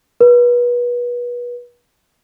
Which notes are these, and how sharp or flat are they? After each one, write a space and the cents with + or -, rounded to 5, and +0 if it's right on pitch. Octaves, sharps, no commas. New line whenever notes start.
B4 -30